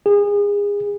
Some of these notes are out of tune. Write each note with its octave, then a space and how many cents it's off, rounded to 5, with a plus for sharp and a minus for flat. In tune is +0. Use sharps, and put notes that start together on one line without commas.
G#4 -30